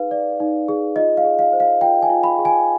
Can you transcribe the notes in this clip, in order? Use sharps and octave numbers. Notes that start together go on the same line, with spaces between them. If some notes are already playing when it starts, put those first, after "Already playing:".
Already playing: D#4 G#4 B4 F5
D5
D#4
G#4
F4 D#5
F5
G#4
F5
C5
F5
F4 G5
G#5
F4
B5
G#4
G#5